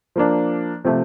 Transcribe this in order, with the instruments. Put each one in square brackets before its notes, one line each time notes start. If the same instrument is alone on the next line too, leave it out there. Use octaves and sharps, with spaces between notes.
[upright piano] F3 A#3 D4
C3 F3 A3